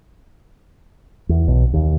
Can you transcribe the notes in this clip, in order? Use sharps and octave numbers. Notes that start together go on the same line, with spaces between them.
E2
B1
D#2